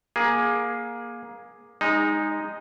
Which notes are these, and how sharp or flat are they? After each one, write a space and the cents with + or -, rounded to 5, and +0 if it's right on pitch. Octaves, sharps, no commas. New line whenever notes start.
A#3 +20 G#4 +0
G#3 -20 D#4 +0